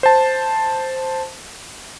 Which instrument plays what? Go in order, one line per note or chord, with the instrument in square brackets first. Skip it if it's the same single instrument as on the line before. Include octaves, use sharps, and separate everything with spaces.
[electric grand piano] C5 A5